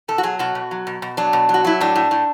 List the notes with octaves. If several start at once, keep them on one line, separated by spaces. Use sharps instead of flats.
B2 A4
F#4
F#3 G#4
B2 F#4
B2
F#3
B2
B2
F#3 D4
B2
F#3
F#4
F#3 E4
A2 D4
A2
A2